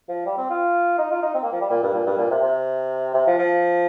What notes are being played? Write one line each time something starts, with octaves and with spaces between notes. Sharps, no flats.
F3
G3
C4
F4
D#4
F4
D#4
C4
A#3
F3
G3
A#2
G2
A#2
G2
A#2
C3
C3
C3
F3
F3